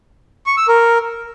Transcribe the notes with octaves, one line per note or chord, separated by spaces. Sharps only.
C#6
E6
A#4